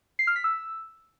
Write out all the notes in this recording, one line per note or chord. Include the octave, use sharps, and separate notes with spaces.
C7
F6
B6
E6